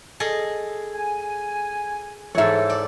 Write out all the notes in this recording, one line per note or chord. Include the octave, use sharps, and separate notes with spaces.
G#4 A4 D#5
G#5
G#2 E3 A4 C#5 E5
D5